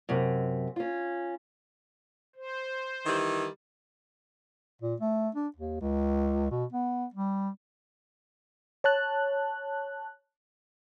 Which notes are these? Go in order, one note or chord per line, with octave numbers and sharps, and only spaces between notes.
F#2 C3
C#4 F4
C5
D#3 E3 G3
A#2
A3
D4
D#2
C#2
B2
B3
G3
C#5 A5 F#6